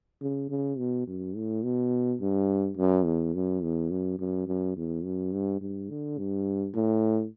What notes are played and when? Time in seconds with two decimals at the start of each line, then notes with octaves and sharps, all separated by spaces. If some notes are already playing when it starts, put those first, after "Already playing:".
0.21 C#3
0.49 C#3
0.78 B2
1.07 F#2
1.36 A2
1.64 B2
2.20 G2
2.77 F#2
3.05 E2
3.34 F#2
3.63 E2
3.90 F#2
4.19 F#2
4.47 F#2
4.76 E2
5.04 F#2
5.32 G2
5.61 G2
5.90 D3
6.18 G2
6.74 A2